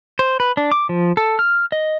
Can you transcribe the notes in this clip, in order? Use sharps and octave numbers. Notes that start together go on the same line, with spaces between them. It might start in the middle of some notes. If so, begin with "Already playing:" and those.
C5
B4
D4
D6
F3
A4
F6
D#5